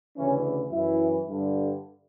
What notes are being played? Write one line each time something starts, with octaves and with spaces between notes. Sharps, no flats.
D2 C#3 E3 C#4
F#2 E3 E4
G2 D3